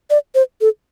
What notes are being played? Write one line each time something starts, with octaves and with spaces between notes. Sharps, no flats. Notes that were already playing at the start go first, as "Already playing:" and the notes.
D5
C5
A4